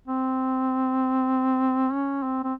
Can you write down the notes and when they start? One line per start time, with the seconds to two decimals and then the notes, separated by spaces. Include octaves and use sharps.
0.07 C4
1.92 C#4
2.23 C4
2.44 C4